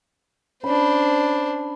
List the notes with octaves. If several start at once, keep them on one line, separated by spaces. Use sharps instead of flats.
C#4 D4 C5 B5